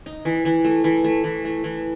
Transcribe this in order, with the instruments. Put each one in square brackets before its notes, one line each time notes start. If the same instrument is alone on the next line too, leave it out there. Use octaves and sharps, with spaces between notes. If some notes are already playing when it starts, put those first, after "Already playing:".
[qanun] D#4
E3
E3
A3
E3
A3
E3
A3
E3